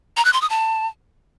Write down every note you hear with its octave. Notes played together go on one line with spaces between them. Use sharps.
A#5
F#6
C6
D#6
A5